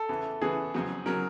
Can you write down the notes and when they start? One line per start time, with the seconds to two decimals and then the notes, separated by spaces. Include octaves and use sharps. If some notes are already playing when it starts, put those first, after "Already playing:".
Already playing: A4
0.09 E2 C#3 E3
0.41 E2 C#3 E3 G#4
0.74 F2 C#3 F#3
1.06 C#3 F#3 A#4